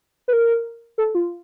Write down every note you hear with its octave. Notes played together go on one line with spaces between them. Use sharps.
B4
A#4
A4
F4